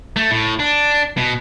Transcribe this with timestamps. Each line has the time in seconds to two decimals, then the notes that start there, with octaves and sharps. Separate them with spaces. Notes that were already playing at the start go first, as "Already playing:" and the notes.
0.16 A3
0.31 A2
0.60 D4
1.17 B2